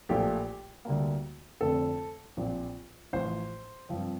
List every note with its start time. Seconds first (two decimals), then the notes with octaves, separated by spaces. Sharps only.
0.09 A#1 A#2 F3 A3 G4
0.85 D2 D3 G3 A#3
1.61 F1 F2 D3 A3 C4 A4
2.37 A#1 A#2 F3 C4
3.13 A1 A2 F3 C5
3.89 G2 F3 C4